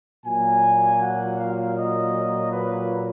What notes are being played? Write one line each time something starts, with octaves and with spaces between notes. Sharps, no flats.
A#2 F#3 A#3 F4 G#5
F#5
F5
D#5
B4